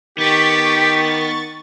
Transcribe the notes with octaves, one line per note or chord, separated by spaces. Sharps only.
D#3 B3 G4 C#6 A6